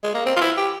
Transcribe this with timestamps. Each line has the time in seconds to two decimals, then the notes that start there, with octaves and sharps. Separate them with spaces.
0.04 G#3
0.14 A#3
0.26 C4
0.36 F4
0.41 E4
0.57 G4